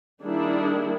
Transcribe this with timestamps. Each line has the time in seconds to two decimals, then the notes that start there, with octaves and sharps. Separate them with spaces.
0.24 D#3 G3 A#3 D4 E4 G#4